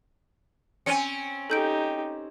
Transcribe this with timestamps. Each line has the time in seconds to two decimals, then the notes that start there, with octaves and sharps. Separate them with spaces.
0.86 C4 C#4 G#5 C#7
1.50 D#4 G4 A4 G6 D7